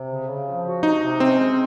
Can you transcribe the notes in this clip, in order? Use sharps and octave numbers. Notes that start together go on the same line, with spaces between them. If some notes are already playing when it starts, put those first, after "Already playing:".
Already playing: C3
C#3
C#3
F3
F#4
C3 D#4
C3
C4 C#4
G#3